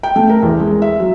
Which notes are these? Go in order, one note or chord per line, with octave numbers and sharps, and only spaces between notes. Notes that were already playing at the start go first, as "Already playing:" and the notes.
G5
A3
A#4
E2
G#3
E5
F#3